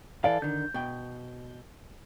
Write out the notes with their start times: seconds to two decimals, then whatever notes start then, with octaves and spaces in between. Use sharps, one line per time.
0.24 E3 A4 D5 F5
0.42 D3 D#3 G6
0.74 B2 G5